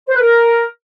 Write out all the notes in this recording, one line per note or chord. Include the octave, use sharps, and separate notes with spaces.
C5
B4
A#4